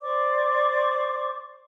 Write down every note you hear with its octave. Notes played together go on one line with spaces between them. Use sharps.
C5 D5 C#6 D6